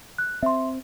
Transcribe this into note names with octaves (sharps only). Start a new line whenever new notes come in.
F#6
C4 E5 C6